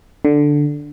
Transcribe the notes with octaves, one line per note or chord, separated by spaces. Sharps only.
D3